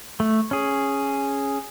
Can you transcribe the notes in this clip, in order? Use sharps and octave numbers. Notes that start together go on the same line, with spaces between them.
A3
C#4 G#4